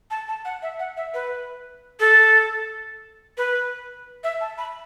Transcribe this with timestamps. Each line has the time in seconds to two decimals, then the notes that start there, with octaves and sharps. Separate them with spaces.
0.11 A5
0.28 A5
0.45 F#5
0.62 E5
0.79 F#5
0.97 E5
1.14 B4
2.00 A4
3.38 B4
4.24 E5
4.41 A5
4.58 B5